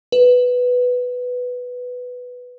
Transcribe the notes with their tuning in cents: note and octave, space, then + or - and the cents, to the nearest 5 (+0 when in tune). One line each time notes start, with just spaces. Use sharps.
B4 +5